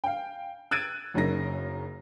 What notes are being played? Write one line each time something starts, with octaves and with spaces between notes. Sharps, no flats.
F5 G5
E6 F#6 G#6 A6 D7 D#7
F#1 F#2 C#3 D#4 A#4 A#6